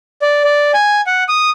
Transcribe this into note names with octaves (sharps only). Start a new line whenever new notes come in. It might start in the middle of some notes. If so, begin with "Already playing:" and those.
D5
D5
G#5
F#5
D#6